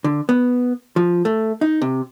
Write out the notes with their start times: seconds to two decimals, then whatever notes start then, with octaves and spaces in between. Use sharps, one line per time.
0.04 D3
0.29 B3
0.96 F3
1.25 A3
1.61 D#4
1.82 C3